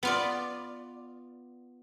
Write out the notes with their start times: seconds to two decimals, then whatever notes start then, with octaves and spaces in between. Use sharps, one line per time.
0.03 B3 F4 D5